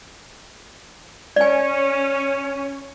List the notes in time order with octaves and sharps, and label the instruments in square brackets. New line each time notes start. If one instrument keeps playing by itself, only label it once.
[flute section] C#4 [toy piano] D5 G#5